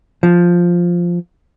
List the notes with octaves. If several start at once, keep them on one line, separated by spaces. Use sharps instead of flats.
F3